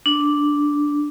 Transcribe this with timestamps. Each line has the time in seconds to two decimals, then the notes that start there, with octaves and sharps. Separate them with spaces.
0.06 D4